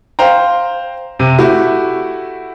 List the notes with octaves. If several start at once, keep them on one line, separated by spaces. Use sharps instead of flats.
C5 F5 G5 A#5
C3
A3 E4 F#4 G4 E5